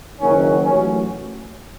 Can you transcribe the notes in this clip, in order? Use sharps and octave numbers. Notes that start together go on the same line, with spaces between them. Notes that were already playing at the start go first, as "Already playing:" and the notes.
F#1 F#2 D#3 F#3 C#4
A1 A2 F#3 C#4